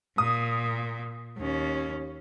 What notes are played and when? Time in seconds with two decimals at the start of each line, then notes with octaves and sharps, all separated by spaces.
0.18 A#2 D#6
1.37 D#2 C#4